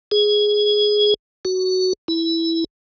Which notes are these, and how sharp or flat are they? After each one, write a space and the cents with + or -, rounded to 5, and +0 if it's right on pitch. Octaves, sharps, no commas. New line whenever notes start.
G#4 +5
F#4 +10
E4 -5